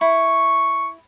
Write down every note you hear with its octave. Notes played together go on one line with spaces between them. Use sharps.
E4 C#6